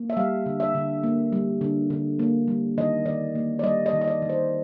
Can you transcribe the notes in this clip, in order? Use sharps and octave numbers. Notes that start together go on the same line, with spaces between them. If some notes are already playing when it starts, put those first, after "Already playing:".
Already playing: A#3
E5
G3 F5
D3
E5
D3
A#3
G3
D3
D3
A#3
G3
D#3 D#5
D#3 D5
A#3
D5
G3 D#5
D#5
D#3
D#5
D5
D#3
C5